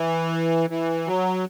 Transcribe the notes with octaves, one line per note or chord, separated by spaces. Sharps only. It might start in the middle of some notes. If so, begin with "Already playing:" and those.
Already playing: E3
E3
F#3